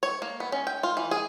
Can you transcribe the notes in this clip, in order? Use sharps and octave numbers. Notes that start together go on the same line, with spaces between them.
C#5
A#3
B3
C#4
G5
F4
E3
G#4